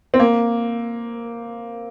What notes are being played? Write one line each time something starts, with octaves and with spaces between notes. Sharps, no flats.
C4
A#3